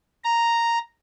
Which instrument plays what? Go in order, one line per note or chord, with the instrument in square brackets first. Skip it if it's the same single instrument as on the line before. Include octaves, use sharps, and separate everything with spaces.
[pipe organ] A#5